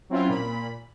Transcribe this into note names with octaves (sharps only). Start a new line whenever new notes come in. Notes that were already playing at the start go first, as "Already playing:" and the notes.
F#3 C4 C#4 E4 F4
A#2 B5